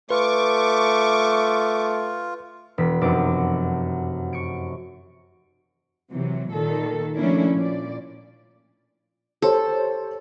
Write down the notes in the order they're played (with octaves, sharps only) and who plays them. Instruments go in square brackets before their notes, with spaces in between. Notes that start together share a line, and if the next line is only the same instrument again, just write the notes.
[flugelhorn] A3 [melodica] F4 [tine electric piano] B4 [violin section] C#6 D6
[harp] E1 B6
F1 F#2 D6
C#6 C#7 D7
[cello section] C3 E3 F#3
A#2 D#3 A4
F3 A3 A#3 C#4 D4 E4
A#2 D5
[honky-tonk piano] G4 C5 C#5 [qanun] A4